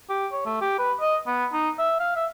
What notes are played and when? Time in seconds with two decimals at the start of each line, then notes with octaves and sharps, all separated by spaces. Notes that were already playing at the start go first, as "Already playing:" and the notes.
0.09 G4
0.32 C#5
0.46 A3
0.61 G4
0.78 B4
1.01 D#5
1.27 B3
1.53 D#4
1.79 E5
2.00 F5
2.16 E5